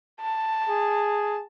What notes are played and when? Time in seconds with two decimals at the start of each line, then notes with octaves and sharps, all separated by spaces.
0.21 A5
0.69 G#4